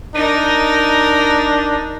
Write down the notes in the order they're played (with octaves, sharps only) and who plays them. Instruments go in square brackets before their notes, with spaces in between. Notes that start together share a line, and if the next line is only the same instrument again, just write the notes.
[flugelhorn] D4 [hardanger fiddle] D#4 A#4